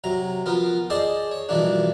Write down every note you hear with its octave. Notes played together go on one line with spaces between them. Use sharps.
C3 F#3 A#5
F3 B3 F4 A#4
G#4 C5 D5 D#5 A5
C#5
G2 B2 E3 F3 A#3 D4